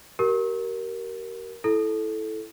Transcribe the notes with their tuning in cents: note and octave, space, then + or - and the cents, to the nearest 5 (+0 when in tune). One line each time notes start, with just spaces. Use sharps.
G4 -35 A#4 +0
E4 +0 A4 -15